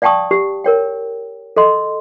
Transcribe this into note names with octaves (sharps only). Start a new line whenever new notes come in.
D5 F5 G5 A5 C#6 D#6
G4
A#4 C#5 G5
A4 D#5 C6